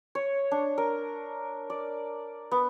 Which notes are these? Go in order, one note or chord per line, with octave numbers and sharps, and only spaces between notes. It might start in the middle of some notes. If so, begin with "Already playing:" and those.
C#5
D4
A#4
D5
B3